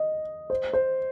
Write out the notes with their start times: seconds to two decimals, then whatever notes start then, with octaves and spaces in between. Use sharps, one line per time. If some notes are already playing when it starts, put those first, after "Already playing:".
Already playing: D#5
0.50 C5
0.73 C5